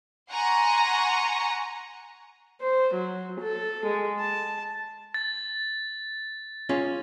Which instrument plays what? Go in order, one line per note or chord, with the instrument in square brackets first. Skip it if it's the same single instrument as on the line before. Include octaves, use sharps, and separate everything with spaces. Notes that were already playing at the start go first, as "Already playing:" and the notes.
[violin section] F#5 G#5 A#5 C6 C#6
[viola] C5
F#3
A4
G#3
A5
[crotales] A6
[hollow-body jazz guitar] C#4 F4 G#4